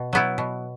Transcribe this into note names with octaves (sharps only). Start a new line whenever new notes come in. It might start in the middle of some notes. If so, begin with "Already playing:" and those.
Already playing: B2
F#3 B3 E4
B2